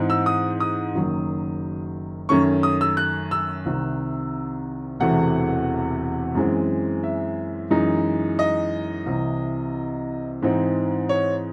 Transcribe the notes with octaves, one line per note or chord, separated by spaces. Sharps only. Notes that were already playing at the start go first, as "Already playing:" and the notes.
Already playing: G#2 E3 C4 D#4
E6
D#6
D#6
F#1 F#2 D#3 F#3
F#2 D#3 A3 C#4 C#6
D#6
E6
F#6
E6
C2 C3 D#3
E1 E2 C3 E3 A3 F#5
F#2 E3 G#3 C4
E5
F#2 E3 G#3 D#4
D#5
C2 C3 E3
G#2 E3 C4 D#4
C#5